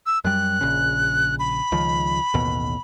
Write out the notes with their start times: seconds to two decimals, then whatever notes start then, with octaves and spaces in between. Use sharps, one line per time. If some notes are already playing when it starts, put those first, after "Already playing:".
0.06 E6
0.24 F#2 G3 F#6
0.61 A#1 C#3
1.39 B5
1.72 C#2 D#3 F3
2.34 A1 D#2 B2